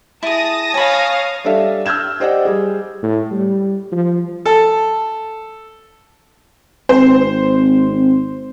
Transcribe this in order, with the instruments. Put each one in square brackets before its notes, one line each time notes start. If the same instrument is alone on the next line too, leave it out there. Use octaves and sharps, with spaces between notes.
[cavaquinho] E4 G#4 [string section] A5 D#6 A#6
[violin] C#5 F5 [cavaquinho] G#5 B5
[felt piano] G3 D4 A4 E5 F5
E6 F6 G6 G#6 E7
G4 C5 D5 D#5 F#5 G5
G3 G#4
[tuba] A2
G3
F3
[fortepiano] A4
[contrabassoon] G#1 [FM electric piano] C4 [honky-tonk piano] C5